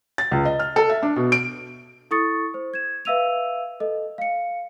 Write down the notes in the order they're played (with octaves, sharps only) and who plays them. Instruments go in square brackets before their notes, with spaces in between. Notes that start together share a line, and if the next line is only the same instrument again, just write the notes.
[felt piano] A6
C#2
D#5
F6
A4
E5
D4
B2
D7
[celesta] E4 A4 C#6 D#6 A6 C#7
C5
G#6 E7
B4 E5 F5 E6 D#7 F7
A4 D#5
F5 C#7